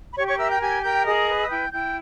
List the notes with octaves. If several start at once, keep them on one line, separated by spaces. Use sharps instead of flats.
B5
G4 C#5 C#6
C#5 C#6
A#4 E5 E6
G5 G6
G4 G#5 G#6
A#4 G5 G6
G#4 D#5 D#6
B4
E6
E4 G5 G6
E4 G5 G6